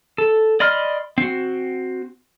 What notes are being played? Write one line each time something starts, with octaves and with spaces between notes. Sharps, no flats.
A4
D5 D#5 B5 C6 F6
C4 F#4